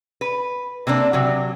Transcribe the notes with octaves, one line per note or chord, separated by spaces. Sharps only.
B4
C3 A#3 C4 D4
C3 F#3